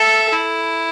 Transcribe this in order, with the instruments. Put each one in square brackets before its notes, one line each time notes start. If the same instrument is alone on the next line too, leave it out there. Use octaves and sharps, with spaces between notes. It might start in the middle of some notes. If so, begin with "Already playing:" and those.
Already playing: [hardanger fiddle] A4 [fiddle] E5
[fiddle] E4